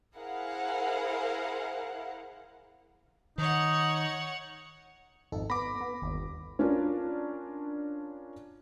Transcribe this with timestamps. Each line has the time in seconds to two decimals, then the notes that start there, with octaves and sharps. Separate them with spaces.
0.16 E4 G#4 A#4 C5 F5 F#5
3.38 D#3 D#4 C#5 F#5
5.32 G#1 F2 D#4 A4
5.50 B3 B5 D6 A#6
5.81 B3
6.02 G1 D#2
6.59 C#4 D4 F4 A#4